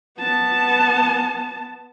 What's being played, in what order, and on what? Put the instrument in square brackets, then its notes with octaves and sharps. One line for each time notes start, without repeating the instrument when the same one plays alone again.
[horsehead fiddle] B3 A5